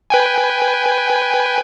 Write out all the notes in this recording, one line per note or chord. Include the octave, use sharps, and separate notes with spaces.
B4 G5 G#5